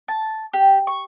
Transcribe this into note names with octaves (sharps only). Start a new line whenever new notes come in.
A5
G4
C#6